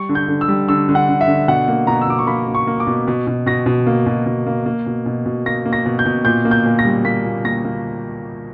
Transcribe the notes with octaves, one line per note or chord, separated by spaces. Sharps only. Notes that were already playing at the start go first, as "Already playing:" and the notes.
Already playing: G3 C#6
D3
G6
D3
E6
G3
D3 E6
D3
F#5
D3
E5
D3
B2 F#5
A#3
B2 A#5
E6
B2 D6
C#6
A#3 B5
A#3
C#6
A#3
D6
B2
B2
B2
B2 A#6
B2
A#3
B2
B2
A#3
A#3
B2
B2
B2
A#3 A#6
A#3
A#6
B2
G6
B2
A#2 G6
A#3
G6
A#2
A#6
G3
A#3 B6
A#2
A#3 A#6
A#3